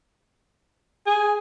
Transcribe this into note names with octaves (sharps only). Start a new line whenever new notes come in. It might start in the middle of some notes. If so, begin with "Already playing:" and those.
G#4